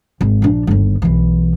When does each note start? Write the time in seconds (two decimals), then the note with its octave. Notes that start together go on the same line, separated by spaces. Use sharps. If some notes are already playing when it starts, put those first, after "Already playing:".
0.21 G#1
0.42 A#1 D4
0.67 G1 D#2
1.02 B1 E3